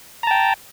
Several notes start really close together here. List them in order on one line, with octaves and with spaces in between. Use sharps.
A#5 A5 G5